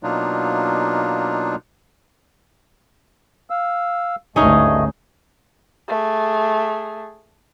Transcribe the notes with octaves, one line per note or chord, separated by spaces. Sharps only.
B2 F#3 A#3 D4 D#4 F4
F5 E6
G#1 D2 G2 A3 C#4 D#4 G#4 D#5
A3 G#4